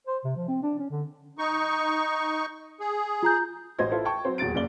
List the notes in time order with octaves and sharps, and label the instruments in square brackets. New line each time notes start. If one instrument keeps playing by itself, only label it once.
[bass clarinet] C5
C3
F3
C4
D4
C#4
D3
[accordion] D#4 C#6
G#4
[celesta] F4 A#5 G6
[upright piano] A1 A2 C5 D#5 G#6
E4 F4 A4 C5
G5 A5 C#6
F#3 C4 C5
D#1 E2 F#3 A6 D7
F#1 C#3 A#3 D5 G7